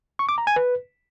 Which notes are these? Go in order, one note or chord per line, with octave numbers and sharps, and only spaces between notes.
C#6
D6
A#5
G#5
B4